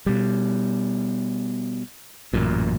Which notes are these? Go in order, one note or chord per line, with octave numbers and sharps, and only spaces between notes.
B2 G3
A1 F#2 A#2